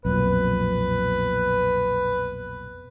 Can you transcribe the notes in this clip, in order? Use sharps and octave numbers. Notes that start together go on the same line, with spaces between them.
B1 F2 A#2 B4